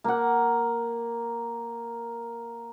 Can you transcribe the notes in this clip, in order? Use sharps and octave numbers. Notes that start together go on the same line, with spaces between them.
A#3 F#5